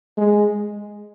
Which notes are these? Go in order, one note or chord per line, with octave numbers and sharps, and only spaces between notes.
G#3